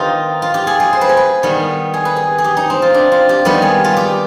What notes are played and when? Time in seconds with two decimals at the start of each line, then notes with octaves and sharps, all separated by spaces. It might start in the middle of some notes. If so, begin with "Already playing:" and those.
Already playing: D#3 B3 D#4 F4 G4 C5
0.42 F4
0.54 G4
0.67 G#4
0.80 G#4
0.93 C5
1.01 B4
1.09 G#4
1.17 B4
1.43 D#3 G3 B3
1.94 G#4
2.05 B4
2.16 G#4
2.38 G#4
2.44 G4
2.57 D#4
2.70 C4
2.82 F4
2.94 D4
3.12 F4
3.29 G4
3.45 D#3 G3 B3 B4
3.62 G#4
3.84 F4
3.97 G4